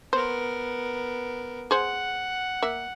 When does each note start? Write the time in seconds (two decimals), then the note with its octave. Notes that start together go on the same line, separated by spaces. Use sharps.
0.13 B3 A#4 C5
1.71 G#4 C5 F#5
2.62 A#3 E5